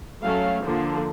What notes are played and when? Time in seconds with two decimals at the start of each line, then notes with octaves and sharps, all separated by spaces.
0.23 F#3 A3 C#4 F5
0.64 D3 F3 A#3